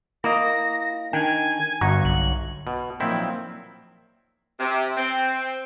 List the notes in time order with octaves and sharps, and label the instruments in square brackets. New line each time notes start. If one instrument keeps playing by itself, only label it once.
[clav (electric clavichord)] A#3 D#5 [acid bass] E4 [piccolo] A#6
[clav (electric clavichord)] D#3 G5 [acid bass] D4 [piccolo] G#5
[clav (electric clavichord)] G1 F#4 A#5 [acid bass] G2 [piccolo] C#6
[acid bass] B1 [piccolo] F#7
[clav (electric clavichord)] B2
[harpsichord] A#2 F3 F#3 [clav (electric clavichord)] D#3 C4 E4
[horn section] C3
C4